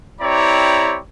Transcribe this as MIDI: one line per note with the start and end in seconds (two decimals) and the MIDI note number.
0.21 0.98 60
0.21 0.98 64
0.21 0.98 67
0.21 0.98 73
0.21 0.98 74
0.21 0.98 82